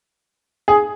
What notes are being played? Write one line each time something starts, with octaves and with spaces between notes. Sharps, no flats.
G#4